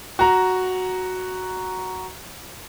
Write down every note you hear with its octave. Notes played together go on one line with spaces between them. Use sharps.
F#4 A#5